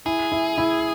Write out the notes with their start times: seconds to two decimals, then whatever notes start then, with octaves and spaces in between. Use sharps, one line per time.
0.06 E4 G#4
0.32 E4
0.58 E4